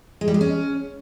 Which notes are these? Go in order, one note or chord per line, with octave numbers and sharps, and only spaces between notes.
G#3
G3
G#3
C#4